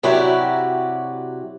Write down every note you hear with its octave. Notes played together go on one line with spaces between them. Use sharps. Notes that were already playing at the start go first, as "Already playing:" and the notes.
C3 F#3 E4 F#4 G4 D5